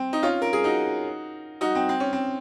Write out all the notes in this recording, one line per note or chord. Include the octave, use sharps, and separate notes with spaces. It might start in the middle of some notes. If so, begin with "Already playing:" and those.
Already playing: C4
D#4
C#4 F4
A#4
G#4
D#4 F#4
D#4 F#4
C4
C4
C#4
C4